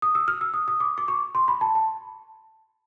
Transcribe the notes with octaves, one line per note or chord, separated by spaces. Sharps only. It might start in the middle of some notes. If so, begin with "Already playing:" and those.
D#6
E6
F6
E6
D#6
D#6
D6
D6
C#6
C6
B5
A5
A5